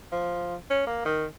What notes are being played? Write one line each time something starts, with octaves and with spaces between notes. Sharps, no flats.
F3
C#4
A#3
D#3